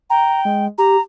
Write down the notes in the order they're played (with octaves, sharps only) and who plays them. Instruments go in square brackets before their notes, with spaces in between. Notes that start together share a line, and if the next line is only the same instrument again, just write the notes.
[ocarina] G5 [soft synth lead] A#5
[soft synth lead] G#3
[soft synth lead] G4 [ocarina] A#5